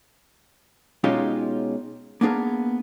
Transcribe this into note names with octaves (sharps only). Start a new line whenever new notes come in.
B2 G#3 C#4 D#4 F4 G4
A#3 B3 D4 G#4 A#4